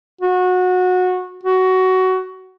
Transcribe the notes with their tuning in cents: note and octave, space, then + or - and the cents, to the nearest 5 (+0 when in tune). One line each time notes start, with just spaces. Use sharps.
F#4 -20
F#4 +15